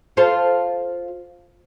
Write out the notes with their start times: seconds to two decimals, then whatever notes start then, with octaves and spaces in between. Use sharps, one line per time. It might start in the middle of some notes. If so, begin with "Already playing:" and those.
0.17 F4 A4 C5